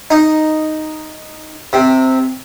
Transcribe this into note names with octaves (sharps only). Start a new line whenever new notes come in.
D#4
C3